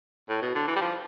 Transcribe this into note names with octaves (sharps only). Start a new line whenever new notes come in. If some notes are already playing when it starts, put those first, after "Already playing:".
A2
B2
D3
E3
G3
F3